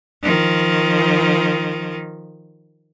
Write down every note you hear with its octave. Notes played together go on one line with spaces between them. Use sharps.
D#3 F3